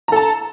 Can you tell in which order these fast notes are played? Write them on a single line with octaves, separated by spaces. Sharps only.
A#5 A4 A5